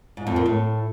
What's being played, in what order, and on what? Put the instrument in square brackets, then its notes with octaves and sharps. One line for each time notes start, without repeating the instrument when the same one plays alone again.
[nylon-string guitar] G#2
F2
A#2
A2